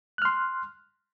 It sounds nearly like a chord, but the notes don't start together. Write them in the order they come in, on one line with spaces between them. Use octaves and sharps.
F#6 F6 C6